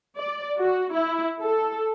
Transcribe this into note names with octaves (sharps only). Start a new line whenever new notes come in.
D5
F#4
E4
A4